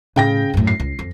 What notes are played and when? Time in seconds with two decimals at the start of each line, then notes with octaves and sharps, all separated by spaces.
0.16 A2 C#3 G5 A#6
0.54 F#2 A2
0.67 C7
0.80 C#2
0.99 F2